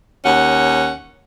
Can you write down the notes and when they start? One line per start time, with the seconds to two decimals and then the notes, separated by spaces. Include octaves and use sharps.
0.25 D#2 C#4 F#5